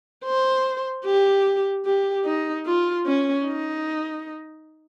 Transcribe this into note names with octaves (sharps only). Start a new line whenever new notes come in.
C5
G4
G4
D#4
F4
C#4
D#4